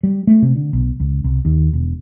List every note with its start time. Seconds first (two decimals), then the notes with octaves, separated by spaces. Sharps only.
0.03 G3
0.27 A3
0.42 C3
0.56 D3
0.73 B1
1.00 C#2
1.24 C2
1.45 D#2
1.73 E1